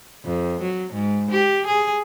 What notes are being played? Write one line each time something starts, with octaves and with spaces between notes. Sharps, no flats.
F2
F#3
G#2
G4
G#4